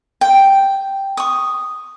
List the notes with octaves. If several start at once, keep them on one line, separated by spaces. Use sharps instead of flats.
G5
C#6 D#6